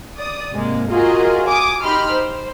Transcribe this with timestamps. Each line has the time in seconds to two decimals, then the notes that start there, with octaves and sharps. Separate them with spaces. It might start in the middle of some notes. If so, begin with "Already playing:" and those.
0.17 D5 D#6
0.53 G#2 C3 G#3 A#3
0.89 F4 F#4 G#4 A#4 D#5
1.46 G#5 D6 D#6
1.83 D#4 G4 B5 C6 F6
2.13 C5